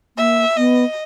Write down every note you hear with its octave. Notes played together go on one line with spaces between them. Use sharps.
A#3 E5
B3 D#5